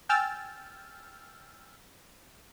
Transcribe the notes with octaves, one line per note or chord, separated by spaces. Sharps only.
G5 G#5 E6 F6 G6 A6